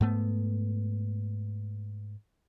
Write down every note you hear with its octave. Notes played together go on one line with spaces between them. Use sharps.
G#2 A3 B3